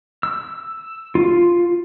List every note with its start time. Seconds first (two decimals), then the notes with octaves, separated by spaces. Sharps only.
0.23 E6
1.15 F4